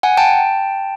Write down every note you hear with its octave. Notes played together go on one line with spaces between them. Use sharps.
F#5 G#5
G5 A5